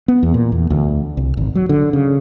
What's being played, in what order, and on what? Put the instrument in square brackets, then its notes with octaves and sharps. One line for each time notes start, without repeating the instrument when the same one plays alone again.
[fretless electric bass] B3
E2
A#2
E2
D2
C2
G#1
F#3
D3
C#3